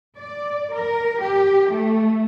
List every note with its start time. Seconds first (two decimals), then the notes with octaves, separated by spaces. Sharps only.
0.17 D5
0.74 A#4
1.20 G4
1.71 A3